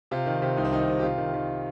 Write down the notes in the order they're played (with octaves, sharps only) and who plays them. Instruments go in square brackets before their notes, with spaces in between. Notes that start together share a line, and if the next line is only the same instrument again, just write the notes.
[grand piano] C3 F4
D#3
C3
C2 D#4
C4
D#3 D#4
C3
G4
C3 F4
D#3
D#3